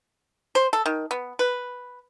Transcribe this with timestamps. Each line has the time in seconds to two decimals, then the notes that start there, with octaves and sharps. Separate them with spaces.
0.55 C5
0.73 A4
0.86 D#3
1.11 B3
1.39 B4